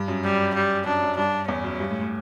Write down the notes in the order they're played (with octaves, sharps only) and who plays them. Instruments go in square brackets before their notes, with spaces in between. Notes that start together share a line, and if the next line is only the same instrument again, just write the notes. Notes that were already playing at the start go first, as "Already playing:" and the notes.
Already playing: [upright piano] G2
F#2
[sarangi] G3
G3
[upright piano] F#2 [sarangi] D4
[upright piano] F#2
[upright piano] G2 [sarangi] D4
[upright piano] E2 [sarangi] C#4
[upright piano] F#2
G2
A2
A2